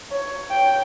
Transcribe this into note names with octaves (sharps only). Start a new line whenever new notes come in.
C#5
G5